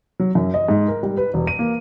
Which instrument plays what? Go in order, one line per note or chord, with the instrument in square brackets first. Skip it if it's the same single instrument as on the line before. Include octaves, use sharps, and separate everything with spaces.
[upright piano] F#3
F#2
D#5
G#2
A#4
G3
B4
E1
D#7
A#3